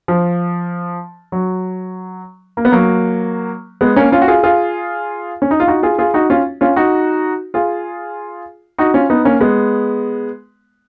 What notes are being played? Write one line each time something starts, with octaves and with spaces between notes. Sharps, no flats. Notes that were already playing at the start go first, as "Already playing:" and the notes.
F3
F#3
A#3
B3
F#3 A#3
G#3 B3
A#3 C#4
C#4 F4
F#4
F4 G#4
F4 G#4
C#4
D#4
F4
D#4 F#4
F4 G#4
F4 G#4
D#4 F#4
C#4 F4
C#4 F4
D#4 F#4
F4 G#4
D#4 F#4
C#4 F4
B3 D#4
A#3 C#4
G#3 B3